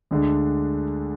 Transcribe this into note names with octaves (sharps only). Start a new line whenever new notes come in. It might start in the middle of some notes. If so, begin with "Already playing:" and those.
D2 D3 G#3 D4